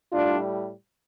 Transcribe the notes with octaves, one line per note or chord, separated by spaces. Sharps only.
A2 G3 D4 F4